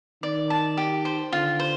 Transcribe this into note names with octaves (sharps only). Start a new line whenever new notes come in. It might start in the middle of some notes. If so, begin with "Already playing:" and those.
D#3 D5
A5
G4
C5
D3 F4
C5